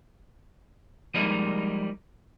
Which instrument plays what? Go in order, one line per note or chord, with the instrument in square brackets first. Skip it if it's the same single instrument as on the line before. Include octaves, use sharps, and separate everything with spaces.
[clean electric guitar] F3 G3 G#3 A#3 D#4